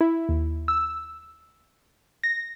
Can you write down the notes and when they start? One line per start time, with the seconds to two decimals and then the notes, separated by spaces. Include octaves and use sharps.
0.01 E4
0.29 D#2
0.68 E6
2.24 A#6